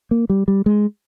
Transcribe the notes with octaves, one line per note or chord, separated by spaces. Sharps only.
A#3
G3
G3
G#3